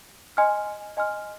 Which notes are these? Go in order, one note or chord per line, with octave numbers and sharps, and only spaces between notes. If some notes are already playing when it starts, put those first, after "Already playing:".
D#5 G#5 C6 F6
D#5 G#5 C6 F6